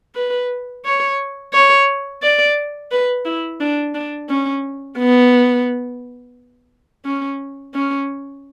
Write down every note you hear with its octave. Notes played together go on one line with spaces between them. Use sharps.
B4
C#5
C#5
D5
B4
E4
D4
D4
C#4
B3
C#4
C#4